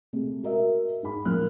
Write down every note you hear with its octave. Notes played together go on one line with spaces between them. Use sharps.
C3 G#3 A3
F#4 A#4 D#5 E5
G#2 B5
A#2 F3 A#4 F6 F#6